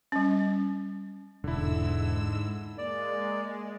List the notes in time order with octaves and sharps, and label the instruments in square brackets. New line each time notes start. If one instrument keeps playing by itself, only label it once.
[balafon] G3 C#4
[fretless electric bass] E1 [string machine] G#2 G#3 E6 [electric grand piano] D3 E4
[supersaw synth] G#3 [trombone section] A#3 [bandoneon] D5